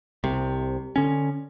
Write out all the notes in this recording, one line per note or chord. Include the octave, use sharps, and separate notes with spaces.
C2 C3
D3 C#4